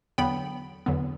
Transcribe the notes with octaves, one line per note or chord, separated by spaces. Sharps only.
E2 D3 F#3 B3 G5 B5
E2 D3 F#3 B3